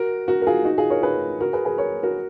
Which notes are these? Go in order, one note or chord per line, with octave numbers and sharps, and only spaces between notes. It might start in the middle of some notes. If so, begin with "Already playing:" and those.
Already playing: F#4 A#4
F#4 A#4
A#4
F4 G#4
D#4 F#4
F4 G#4
A#4 C#5
G#4 B4
F#4 A#4
G#4 B4
G#4 B4
A#4 C#5
F#4 A#4